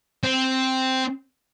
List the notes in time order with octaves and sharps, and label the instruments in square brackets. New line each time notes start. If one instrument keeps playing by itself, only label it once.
[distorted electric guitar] C4